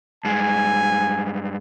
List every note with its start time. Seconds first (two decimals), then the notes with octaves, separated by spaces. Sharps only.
0.25 G2 G#3 G#5